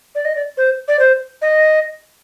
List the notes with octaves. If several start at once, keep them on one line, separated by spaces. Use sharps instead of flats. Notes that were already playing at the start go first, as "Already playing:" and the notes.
D5
D#5
D5
C5
D5
C5
D#5